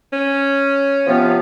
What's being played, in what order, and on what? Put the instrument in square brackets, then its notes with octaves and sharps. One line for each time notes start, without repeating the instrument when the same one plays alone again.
[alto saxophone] C#4
[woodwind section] C3 F3 B3